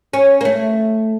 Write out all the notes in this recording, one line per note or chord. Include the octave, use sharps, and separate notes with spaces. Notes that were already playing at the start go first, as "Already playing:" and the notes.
C#4
A#3
A3